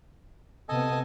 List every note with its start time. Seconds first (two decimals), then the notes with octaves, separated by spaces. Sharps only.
0.69 C3 B3 A4 D#5 G#5